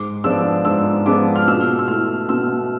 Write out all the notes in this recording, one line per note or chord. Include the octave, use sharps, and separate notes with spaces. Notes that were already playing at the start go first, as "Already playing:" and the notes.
Already playing: G#2 D6
F3 G#3 B3 D4 E6
G#2 E6
F3 G#3 B3 D4 D6
F6
B2 E6
E6
A3 E4 F6
B2 E6